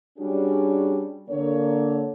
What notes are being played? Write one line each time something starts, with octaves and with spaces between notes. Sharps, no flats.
G3 C#4 D4 F#4 G#4
D3 A#3 C#5